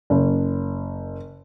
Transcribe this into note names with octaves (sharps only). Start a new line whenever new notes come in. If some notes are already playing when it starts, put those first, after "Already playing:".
F#1